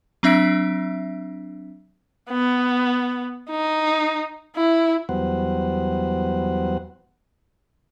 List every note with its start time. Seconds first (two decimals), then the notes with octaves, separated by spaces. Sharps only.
0.23 F#3 C4 D4 E5 B6 D7
2.30 B3
3.50 D#4
4.56 E4
5.09 E2 F#3 G3 B3 C5 F#5